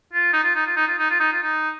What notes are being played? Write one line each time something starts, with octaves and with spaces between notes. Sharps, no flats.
F4
D#4
F4
D#4
F4
D#4
F4
D#4
F4
D#4
F4
D#4